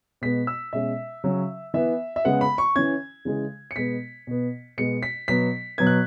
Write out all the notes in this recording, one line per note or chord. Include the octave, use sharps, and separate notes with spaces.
B2 G#3 B3 B6
E6
B2 G#3 C#4 E5
C#3 F#3 C#4
E3 B3 E5
E5
C#3 G#3 B3 F#5
B5
C#6
E3 C#4 G#6
C#3 E3 G#3
C#7
B2 G#3 B3 B6
B2 B3
B2 G#3 B3 C#7
B6
B2 F#3 B3 B6
B2 F#3 B3 G#6
F#6